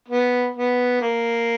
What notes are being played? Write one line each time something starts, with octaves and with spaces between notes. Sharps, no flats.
B3
B3
A#3